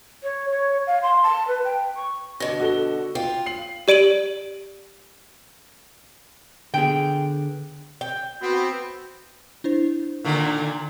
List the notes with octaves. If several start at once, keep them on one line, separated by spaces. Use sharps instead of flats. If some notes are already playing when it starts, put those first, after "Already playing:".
C#5
C#5
F5
C6
A5
B4
G5
C#6
B2 D3 A#6
F#4 A4 G7
F4 G5
C7 F#7
G4 D5 D7 D#7 F#7
D3 B3 G#4 G5
G5
B3 C4 F#4
D4 E4 C5
A#2 D3 D#3